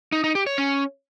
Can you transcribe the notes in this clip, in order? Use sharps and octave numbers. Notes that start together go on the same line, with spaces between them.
D#4
D#4
G4
C#5
C#4